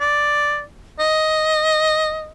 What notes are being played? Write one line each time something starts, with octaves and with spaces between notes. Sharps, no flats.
D5
D#5